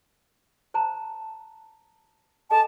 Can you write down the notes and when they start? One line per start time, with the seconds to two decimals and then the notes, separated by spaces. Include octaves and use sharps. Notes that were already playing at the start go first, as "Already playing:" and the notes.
0.74 C5 A5 A#5
2.51 A4 D#5 G#5 A5